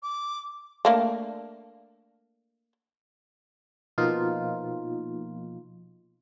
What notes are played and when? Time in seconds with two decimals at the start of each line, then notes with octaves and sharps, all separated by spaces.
0.03 D6
0.85 A3 A#3 D4
3.98 B2 F3 A#3 D#4 F4